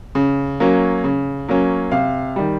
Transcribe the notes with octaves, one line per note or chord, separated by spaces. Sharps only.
C#3
F#3 A#3 C#4
C#3
F#3 A#3 C#4
C3 F5
D#3 G3